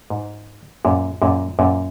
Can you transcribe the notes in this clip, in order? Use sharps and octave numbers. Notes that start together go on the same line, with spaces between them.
G#2
F#2 A#2
F#2 A#2
F#2 A#2